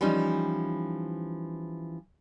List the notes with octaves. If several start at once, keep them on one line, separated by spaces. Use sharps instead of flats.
E3 F3 G3 C#4 D#4